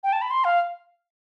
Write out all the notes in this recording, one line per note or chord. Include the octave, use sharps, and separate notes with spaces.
G5
A5
B5
C6
F5